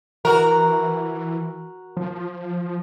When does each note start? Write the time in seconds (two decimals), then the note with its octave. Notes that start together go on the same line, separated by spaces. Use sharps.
0.25 E3 F#4 A#4
1.97 F3